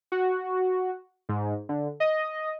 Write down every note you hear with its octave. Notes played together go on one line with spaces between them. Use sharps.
F#4
G#2
D3
D#5